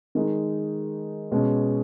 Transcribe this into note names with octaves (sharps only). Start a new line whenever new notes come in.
D#3 G#3 D#4
B2 G#3 C#4